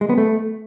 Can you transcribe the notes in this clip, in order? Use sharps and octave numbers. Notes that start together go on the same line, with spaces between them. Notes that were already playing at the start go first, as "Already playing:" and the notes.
G#3
B3
A3